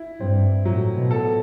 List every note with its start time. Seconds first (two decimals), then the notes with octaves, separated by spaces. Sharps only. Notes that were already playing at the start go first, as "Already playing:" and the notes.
Already playing: E4
0.20 G2 C4
0.65 A2 F#3
0.96 B2
1.11 A4